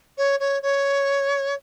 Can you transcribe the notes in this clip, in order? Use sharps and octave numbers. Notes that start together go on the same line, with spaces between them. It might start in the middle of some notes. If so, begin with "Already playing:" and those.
C#5
C#5
C#5